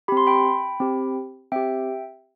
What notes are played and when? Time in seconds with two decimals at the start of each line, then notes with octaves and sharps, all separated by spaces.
0.08 C4 G4 B5
0.17 C6
0.27 G5 B5
0.80 C4 G4
1.52 C4 G4 E5 G5